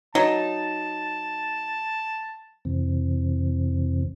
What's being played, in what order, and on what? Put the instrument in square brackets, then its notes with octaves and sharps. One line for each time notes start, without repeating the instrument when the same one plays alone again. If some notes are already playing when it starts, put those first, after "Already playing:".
[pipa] F#3 [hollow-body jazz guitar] D#4 [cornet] A5
[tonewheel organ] F2 C3 E3 C4